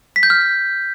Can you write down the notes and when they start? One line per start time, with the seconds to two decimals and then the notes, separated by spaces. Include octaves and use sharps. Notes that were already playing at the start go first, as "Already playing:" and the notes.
0.16 B6
0.23 G6
0.30 F6